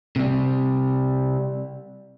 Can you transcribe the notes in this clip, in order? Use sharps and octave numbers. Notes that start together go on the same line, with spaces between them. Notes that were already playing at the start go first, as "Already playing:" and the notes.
C3 G3